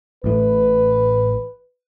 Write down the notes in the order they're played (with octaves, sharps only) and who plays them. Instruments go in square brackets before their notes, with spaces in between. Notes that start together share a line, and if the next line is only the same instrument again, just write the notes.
[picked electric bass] A1 A2 [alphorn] B4